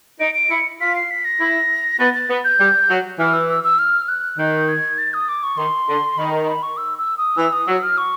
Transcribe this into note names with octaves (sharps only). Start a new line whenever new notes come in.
D#4 D7
D7
E4 C#7
F4 B6
C7
B6
A#6
E4
B3 A6
A6
B3
G6
G3
F#3
E3 F6
E6
E6
E6
F6
F#6
D#3 G6
G#6
A6
D#6
D6
C#6
D#3 C6
D3
D#3 B5
A#5
B5
C#6
E6
E6
D#6
E3 E6
D#6
F#3 E6
F6
C#6